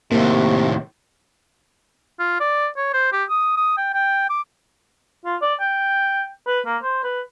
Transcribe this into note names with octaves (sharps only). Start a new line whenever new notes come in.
D#2 A2 C3 A#3
F4
D5
C#5
C5
G4
D#6
D#6
G5
G5
D6
F4
D5
G5
B4
A#3
C5
B4